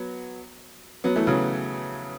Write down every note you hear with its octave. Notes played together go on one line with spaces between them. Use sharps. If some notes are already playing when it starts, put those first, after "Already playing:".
Already playing: F#3 B3
F#3 B3
E3 A3
C#3 F#3